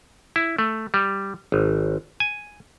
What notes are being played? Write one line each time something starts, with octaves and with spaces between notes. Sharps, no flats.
E4
A3
G3
G#1
G#5